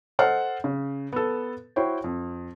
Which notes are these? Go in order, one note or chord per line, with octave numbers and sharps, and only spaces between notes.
A4 C5 D#5 F#5 F6
C#3
B3 A4
E4 F#4 C5 C#5 G5
F2